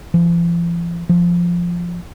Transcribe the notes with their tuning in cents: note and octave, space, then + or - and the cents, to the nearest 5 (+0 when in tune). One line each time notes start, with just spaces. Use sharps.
F3 -45
F3 -5